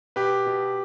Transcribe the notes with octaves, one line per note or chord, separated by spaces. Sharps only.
B2 G4 B4
B2